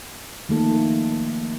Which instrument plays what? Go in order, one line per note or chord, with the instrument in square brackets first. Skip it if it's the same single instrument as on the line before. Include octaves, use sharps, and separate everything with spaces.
[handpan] D#3 F3 A3 A#3 A4